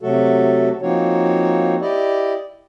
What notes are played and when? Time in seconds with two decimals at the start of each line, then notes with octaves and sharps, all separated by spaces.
0.01 C3 F#3 A3 F#4 A4
0.82 F3 A#3 C4 D#4 F#4 C#5
1.82 E4 G4 D5 D#5